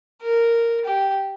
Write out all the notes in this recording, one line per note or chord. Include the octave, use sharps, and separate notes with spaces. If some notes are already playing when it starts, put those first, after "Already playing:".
A#4
G4